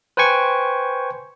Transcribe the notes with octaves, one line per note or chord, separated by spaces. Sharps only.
B4 C5 G5 G#5 C#6